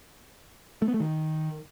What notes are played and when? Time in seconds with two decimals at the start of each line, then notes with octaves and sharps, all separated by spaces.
0.82 A3
0.88 B3
0.94 A3
1.00 D#3